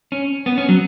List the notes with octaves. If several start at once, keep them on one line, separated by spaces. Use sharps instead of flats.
C#4
B3
C#4
F#3